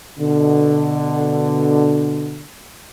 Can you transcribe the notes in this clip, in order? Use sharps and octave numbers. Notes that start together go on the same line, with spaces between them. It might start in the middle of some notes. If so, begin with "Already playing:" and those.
B2 D3